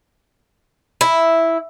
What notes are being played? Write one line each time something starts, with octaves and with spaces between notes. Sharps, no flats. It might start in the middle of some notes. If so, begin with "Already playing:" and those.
E4